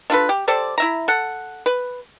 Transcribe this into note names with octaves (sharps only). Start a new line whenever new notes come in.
D4 F4 A4 B4
G4
G4 A4 C5 D5
E4 E5 A#5
A4 F#5
B4